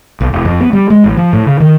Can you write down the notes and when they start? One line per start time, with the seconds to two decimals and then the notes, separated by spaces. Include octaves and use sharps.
0.21 B1
0.33 E1
0.45 F2
0.60 B3
0.73 G3
0.90 G#3
1.04 A1
1.17 F3
1.33 A2
1.47 C#3
1.60 D#3